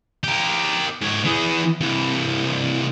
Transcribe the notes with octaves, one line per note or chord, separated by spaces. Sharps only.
G4 A#4
G#2 C#5
E3 G#4
C2 E3